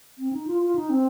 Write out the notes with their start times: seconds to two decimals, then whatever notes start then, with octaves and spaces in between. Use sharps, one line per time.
0.18 C4
0.33 D#4
0.47 F4
0.62 F4
0.76 D#4
0.90 C4